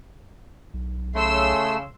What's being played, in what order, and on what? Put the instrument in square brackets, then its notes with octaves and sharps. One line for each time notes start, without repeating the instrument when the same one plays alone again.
[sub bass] B1
[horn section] C#3 [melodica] A3 [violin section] C6 E6